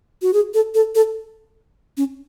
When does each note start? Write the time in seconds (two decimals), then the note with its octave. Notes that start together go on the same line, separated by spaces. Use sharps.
0.22 F#4
0.33 G#4
0.54 A4
0.75 A4
0.95 A4
1.97 C#4